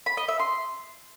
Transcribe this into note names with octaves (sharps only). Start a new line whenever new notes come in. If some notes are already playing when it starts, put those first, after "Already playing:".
B5
D#5
E5
C6